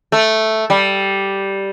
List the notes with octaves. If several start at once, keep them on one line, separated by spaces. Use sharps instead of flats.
A3
G3